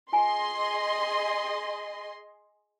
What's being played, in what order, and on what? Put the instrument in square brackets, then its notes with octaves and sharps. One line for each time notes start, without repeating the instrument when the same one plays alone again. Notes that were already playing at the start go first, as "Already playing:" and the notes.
[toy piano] F4 G#5 A#5 [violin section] G#4 D#5 C6